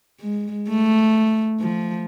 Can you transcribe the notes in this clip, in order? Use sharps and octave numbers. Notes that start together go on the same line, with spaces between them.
G#3
A3
F3